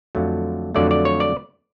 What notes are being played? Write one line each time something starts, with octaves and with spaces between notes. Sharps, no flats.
F2 D3 F#3 A3
F2 D3 F#3 A3 D5
D5
C#5
D5